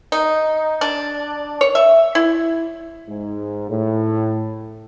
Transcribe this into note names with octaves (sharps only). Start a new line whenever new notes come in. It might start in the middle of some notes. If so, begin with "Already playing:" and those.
D#4
D4
C#5
E5
E4
G#2
A2